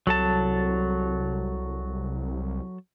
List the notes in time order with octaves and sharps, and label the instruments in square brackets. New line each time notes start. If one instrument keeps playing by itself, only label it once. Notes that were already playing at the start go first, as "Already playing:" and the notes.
[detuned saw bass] C2 [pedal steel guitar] F#3 A4 A5